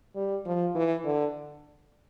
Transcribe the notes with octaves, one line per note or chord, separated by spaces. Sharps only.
G3
F3
E3
D3